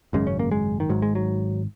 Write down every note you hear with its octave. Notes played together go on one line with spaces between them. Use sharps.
G#1 F#2 C#3 G#3
C#4
A#3
G#3
D#3
G#1 G#2 F#3
G#3
F#3